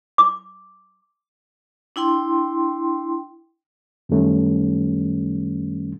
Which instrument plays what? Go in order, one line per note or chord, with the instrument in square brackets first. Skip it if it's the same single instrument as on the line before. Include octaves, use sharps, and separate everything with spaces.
[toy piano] D6
[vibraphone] D4 E4 G5 C6
[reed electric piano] F#2 D#3 G3 A3 C#4